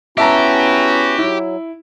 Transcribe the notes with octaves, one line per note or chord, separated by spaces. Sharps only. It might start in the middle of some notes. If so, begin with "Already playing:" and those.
B3 C#4 E4 F#4 G4 E5 A5 A#5
F#3 E4